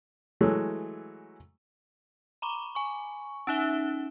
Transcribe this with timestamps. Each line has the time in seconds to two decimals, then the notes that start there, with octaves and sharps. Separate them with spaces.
0.41 E3 F#3 G#3 A3
2.42 A#5 B5 C#6 D6
2.75 G#5 C#6
3.47 C#4 D#4 E5